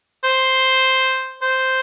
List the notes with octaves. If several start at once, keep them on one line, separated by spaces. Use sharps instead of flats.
C5
C5